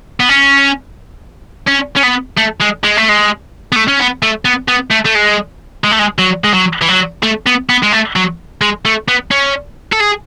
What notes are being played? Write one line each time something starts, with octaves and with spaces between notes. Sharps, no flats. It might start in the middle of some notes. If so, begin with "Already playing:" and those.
B3
C#4
C#4
C#4
B3
A3
G#3
G#3
A3
G#3
B3
A3
C#4
B3
A3
B3
B3
A3
A3
G#3
G#3
A3
G#3
F#3
G#3
F#3
E3
F#3
A3
B3
B3
G#3
A3
F#3
G#3
A3
B3
C#4
A4
G#4